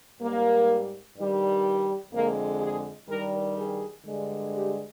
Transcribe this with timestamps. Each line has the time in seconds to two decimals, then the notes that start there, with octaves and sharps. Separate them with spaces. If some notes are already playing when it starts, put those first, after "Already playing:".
0.21 G#2 G3 A#3
1.17 G2 D#3 G3
2.13 F2 D3 G#3 A#3
2.61 G#4
3.09 G2 D#3 G3 A#4
3.57 G#4
4.05 G2 D3 G#3
4.53 G4